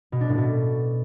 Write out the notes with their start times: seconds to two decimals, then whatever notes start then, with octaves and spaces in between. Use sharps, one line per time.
0.12 B2
0.21 D4
0.29 A2
0.38 B2